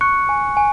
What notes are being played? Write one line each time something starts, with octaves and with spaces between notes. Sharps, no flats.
C#6 F#6 C#7
G#5
G#5